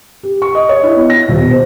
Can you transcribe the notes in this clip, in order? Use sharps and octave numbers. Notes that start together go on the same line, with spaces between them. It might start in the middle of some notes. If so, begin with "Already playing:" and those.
G4
C#6
D#5
C#5
E4
B3
A#6
D#1
B2
C5